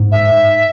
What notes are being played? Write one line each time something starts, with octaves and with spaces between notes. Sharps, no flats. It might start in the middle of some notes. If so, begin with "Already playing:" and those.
Already playing: G#2
E5